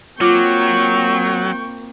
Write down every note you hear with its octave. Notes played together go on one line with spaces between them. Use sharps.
F#3 A#3 C4 F4 G5 C#6 D6